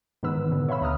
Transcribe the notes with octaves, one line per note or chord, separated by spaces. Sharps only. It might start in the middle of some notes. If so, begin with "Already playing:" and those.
G#2 D#3 E3 B3 B4 E6
B2 D3 B3
C#5 E5 F5 B5 E6
D2 A#5 D#6 F6